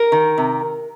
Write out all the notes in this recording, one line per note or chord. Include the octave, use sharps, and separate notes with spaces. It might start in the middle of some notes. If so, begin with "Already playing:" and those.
Already playing: A#4
D#3
C3